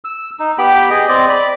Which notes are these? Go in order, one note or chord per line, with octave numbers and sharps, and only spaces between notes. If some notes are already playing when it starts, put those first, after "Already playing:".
E6
D#4
B3 G4 G5 B5
G#4 D#5
C4 D5 D#5
D5 B5